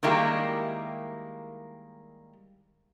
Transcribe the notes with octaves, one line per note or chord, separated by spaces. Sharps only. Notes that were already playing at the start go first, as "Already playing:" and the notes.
D#3 G3 G#3 A#3 E4 G4